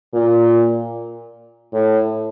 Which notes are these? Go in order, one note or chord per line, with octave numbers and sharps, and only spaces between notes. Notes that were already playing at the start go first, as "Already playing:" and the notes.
A#2
A2